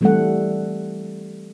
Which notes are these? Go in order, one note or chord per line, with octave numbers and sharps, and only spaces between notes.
E3 G3 A3 C4 A4 F#5